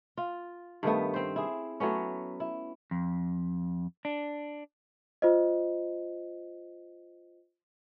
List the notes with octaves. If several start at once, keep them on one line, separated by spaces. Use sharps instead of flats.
F4
G2 D#3 A3 B3
C4 C5
E4 G#4
F#3 A3 B3 C#4
E4
F2
D4
F4 C5 D#5